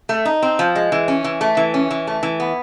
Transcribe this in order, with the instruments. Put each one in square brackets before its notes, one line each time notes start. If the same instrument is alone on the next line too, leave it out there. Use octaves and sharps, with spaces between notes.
[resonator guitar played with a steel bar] A3
D#4
C4
F3
G#3
E3
C#4
E3
A3
E3
C#4
E3
A3
E3
B3